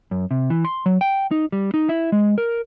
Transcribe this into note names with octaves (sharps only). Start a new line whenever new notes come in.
F#2
C3
E3
C6
F#3
G5
D#4
G3
D#4
E4
G#3
A#4